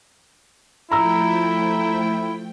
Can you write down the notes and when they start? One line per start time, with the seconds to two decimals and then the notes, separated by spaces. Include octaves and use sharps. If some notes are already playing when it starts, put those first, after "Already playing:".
0.91 F3 A3 E4 G5 A#5 E6